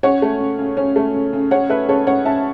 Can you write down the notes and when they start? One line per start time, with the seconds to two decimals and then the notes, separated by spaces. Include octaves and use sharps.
0.03 C#4 C#5 F#5
0.22 A3
0.40 C#3
0.59 C#3
0.77 C#4
0.96 A3
1.14 C#3
1.33 C#3
1.51 C#4 C#5 F#5
1.69 A3 B4 E5
1.88 C#3 A4 C#5
2.07 C#3 C#5 F#5
2.25 C#4 E5 A5